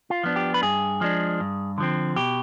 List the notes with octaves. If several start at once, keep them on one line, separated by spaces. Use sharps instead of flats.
F4
F3 B3 D4
G4
B4
G2 G#4
F3 G#3 D4
G2
D3 F3 C4
B2 G4